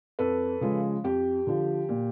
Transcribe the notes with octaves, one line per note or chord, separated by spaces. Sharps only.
F2 A4 B4
C#3 F3 G#3
F2 G4
D3 F3
A#2